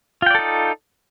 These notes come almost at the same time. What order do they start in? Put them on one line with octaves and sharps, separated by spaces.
F4 G5 D5 A4 D#4